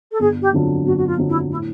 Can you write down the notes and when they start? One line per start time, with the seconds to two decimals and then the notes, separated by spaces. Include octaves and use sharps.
0.11 A4
0.20 G1 G#4
0.41 G4
0.52 F2 D3 F#3
0.85 G1 F#4
0.97 F#4
1.06 F4
1.18 F2 D3 F#3
1.28 E4
1.50 A2 E4